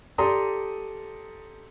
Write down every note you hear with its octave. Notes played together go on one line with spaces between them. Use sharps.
G4 A4 D5 A#5 C6 D#6